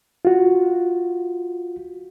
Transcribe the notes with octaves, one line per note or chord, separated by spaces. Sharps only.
F4 F#4